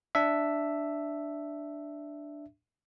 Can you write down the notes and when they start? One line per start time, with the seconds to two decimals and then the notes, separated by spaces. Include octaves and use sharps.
0.15 D4 E5